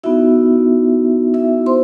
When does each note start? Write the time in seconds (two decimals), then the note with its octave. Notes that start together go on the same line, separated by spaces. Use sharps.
0.03 B3 D#4 E4 F#4 E5
1.34 E4 E5
1.66 C5 C6